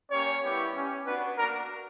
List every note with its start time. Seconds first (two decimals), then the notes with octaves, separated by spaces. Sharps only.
0.11 A#3 C#4 G4 C#5
0.43 G3 B3 E4 G4
0.74 C#4 G4
1.05 B3 D4 F#4 B4
1.37 A#3 D4 F#4 A#4